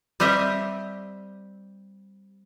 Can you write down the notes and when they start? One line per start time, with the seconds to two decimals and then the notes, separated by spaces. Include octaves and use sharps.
0.20 G3 C4 G4 D#5 E5